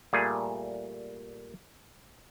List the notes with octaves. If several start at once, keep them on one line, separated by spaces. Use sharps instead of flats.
A#2 G3 A3 G#4